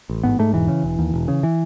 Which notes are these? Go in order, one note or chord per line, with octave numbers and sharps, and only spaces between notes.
A1
G#2 B3
G#2 A3
E1 E3
C#3
E1
D#2
E1
C#3
E3